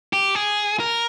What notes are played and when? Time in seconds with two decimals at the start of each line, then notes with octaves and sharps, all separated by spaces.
0.13 G4
0.35 G#4
0.80 A#4